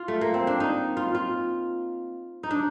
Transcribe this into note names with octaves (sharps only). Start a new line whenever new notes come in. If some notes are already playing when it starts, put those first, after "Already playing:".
Already playing: F4
A3
A#3
C4
D4
D#4
F4
F4
D#4
D4